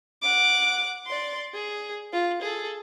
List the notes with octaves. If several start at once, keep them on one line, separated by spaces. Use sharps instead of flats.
F#5 D6
D5 C6
G#4
F4
G#4 A4